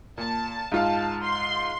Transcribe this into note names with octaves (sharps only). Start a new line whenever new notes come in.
A#2 A5
G#2 F4 F5 A5
C6